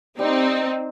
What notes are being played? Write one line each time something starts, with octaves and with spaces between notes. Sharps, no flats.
G3 C4 D#4